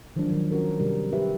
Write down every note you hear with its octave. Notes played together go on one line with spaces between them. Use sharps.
D#3 F3 F#3 G#3 D4
D#3 F3 F#3
C#4 F#4 A#4
C3 G3 A#4
G4 B4 E5